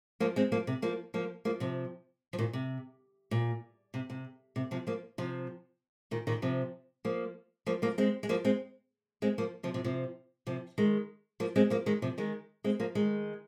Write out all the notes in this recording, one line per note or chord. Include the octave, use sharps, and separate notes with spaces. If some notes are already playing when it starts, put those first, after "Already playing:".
F3 A#3
G#3 C4
F3 A#3
C3
F3 A#3
F3 A#3
F3 A#3
C3 F3
F3
A#2 D#3
C3
A#2
C3
C3
C3
C3 F3
F3 A#3
C3 F3
A#2 D#3
A#2 D#3
C3 F3
F3 A#3
F3 A#3
F3 A#3
G#3 C4
G#3
F3 A#3
G#3 C4
G#3 C4
F3 A#3
C3 F3
C3 F3
C3 F3
C3 F3
D#3 G#3
F3 A#3
G#3 C4
F3 A#3
D#3 G#3
C3 F3
D#3 G#3
G#3 C4
F3 A#3
D#3 G#3